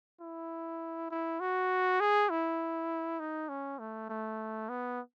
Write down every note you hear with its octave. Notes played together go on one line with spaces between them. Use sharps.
E4
E4
F#4
G#4
E4
D#4
C#4
A3
A3
B3